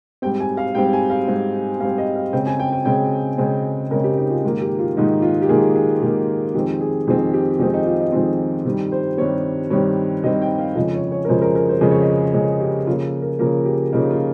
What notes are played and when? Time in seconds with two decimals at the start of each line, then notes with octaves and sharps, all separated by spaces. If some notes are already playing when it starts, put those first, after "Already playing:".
0.22 G#2 G3 C4 G5
0.40 G#5
0.57 F5
0.75 G#2 G3 C4 G5
0.93 G#5
1.10 F5
1.28 G#2 G3 C4
1.80 G#2 G3 C4 F5
1.98 D#5
2.16 F5
2.33 C#3 G#3 C4 G5
2.47 G#5
2.59 G5
2.72 G5
2.85 C#3 G#3 C4 G5
3.38 C#3 G#3 C4
3.91 C#3 G#3 C4 A#4
4.04 G4
4.18 D#4
4.30 F4
4.44 G#2 D#3 A#3 F4
4.62 G4
4.79 F4
4.96 G#2 D#3 A#3 D#4
5.22 F4
5.42 G4
5.49 G#2 D#3 A#3 G#4
5.76 G#4
6.02 G#2 D#3 A#3 G4
6.55 F2 D#3 G#3 C4 G4
6.81 G#4
7.07 F2 D#3 G#3 C4 G#4
7.33 G4
7.59 F2 D#3 G#3 C4 D#4
7.74 D#4
7.86 F4
8.00 D#4
8.12 F2 D#3 G#3 C4 F4
8.65 G2 D#3 G3 C4
8.92 C5
9.17 G2 D#3 G3 C4 C#5
9.71 G2 D#3 G3 C4 C#5
10.24 G2 D#3 G3 C4 D#5
10.42 G5
10.59 F5
10.76 F2 C#3 F3 G#3 D#5
10.94 C#5
11.12 C#5
11.25 A#4
11.28 F2 C#3 F3 G#3 C5
11.42 A#4
11.55 A#4
11.69 C5
11.81 F2 C#3 F3 G#3 D#5
11.91 C#5
12.01 D#5
12.34 F2 C#3 F3 G#3 G#4
12.60 G4
12.87 C#3 F3 A#3 F4
13.22 A#4
13.39 C#3 F3 A#3 A#4
13.65 G4
13.93 C#3 F3 A#3 D#4
14.10 F4